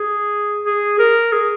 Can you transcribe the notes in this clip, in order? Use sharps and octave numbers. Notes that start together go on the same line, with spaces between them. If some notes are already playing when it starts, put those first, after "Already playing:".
Already playing: G#4
G#4
A#4
G#4